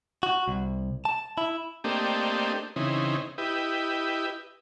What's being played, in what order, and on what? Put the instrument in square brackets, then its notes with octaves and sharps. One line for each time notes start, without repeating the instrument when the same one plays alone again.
[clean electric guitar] F#4
C2
A5
E4
[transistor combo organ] A3 A#3 C4 D4 G4 D#5
C#3 E3 C4 D#4
E4 G4 B4 D#5